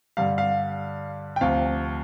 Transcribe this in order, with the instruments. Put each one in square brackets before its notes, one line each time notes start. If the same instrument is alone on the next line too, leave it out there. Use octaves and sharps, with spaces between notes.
[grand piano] G2 D3 G3 F5
F5
G5
D2 C3 F3 C4 F5